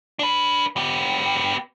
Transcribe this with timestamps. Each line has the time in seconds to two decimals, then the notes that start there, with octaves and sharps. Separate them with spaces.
0.19 D4 B4
0.77 B3 G4